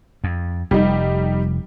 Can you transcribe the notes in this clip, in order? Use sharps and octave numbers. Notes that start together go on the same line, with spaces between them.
F2
F1 G3 D#4